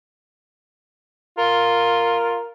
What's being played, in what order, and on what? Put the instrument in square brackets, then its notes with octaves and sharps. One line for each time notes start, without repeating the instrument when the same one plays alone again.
[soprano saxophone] F4 [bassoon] A#4